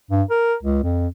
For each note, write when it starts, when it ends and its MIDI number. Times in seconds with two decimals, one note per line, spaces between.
0.11 0.23 43
0.30 0.55 70
0.63 0.80 37
0.83 1.08 41